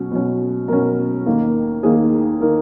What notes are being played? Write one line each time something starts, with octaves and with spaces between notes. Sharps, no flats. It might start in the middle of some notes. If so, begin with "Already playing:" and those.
Already playing: B2 F#3 C#4
B2 F#3 C#4
B2 F#3 C#4 A#4
D#2 D#3 A#3
D#2 D#3 A#3 G#4
D#3 A#3 A#4